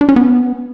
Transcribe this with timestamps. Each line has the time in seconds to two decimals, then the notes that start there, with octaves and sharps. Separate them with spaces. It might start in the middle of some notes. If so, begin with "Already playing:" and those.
0.01 D4
0.09 C#4
0.16 B3